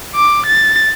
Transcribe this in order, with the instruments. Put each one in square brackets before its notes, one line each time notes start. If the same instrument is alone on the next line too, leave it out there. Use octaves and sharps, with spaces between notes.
[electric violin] D6
A6